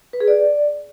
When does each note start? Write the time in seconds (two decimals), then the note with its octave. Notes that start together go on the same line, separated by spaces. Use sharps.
0.13 B4
0.20 G#4
0.28 D5